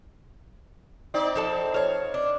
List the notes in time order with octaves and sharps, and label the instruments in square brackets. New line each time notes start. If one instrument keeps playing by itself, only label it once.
[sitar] C4 D#4 D5
[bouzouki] F3 A4 A5
C#5 F5
D4